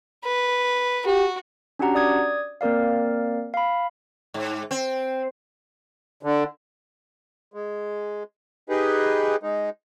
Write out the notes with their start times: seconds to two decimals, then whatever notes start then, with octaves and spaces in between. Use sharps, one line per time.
0.24 B4
1.06 F#4 G4
1.79 C#4 D4 F#4 G4 F#5 A#5
1.95 D5 D#6 G#6
2.61 A#3 C4 A#4 D5 F5
3.54 F5 B5
4.34 G#2
4.71 C4
6.23 D3
7.54 G#3
8.69 D#4 G4 G#4 B4
9.43 G#3 D#4